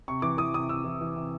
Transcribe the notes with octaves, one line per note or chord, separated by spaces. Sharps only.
C3 C#6
E3 D6
E3 D#6
C3 D#6
C3 E6
E3
E3
C3